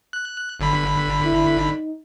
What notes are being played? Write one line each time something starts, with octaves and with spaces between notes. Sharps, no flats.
F#6
G1 D3 B5
E4
D#4